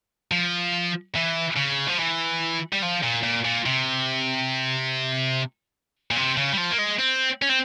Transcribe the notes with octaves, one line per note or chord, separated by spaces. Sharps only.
F3
E3
C#3
F3
E3
G3
F3
A#2
A#2
A#2
C3
A#2
C3
C#3
G3
F3
A#3
G#3
C4
C#4
C4